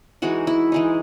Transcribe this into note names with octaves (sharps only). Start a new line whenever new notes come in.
E3 G#3 D#4 F#4
E4
E3 G#3 D#4